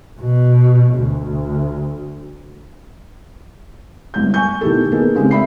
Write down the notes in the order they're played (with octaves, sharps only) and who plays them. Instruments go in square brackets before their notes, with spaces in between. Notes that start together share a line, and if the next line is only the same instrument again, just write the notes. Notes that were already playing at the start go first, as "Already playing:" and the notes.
[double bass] B2
D2
[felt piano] G1 C2 G6
G#5 C#6 G6
B2 D#3 A3 E4 G4 A4
A#3 B3 D#4 G#4 A4
C#3 G#3 A3 C4 D4 G4
C4 E5 B5 C7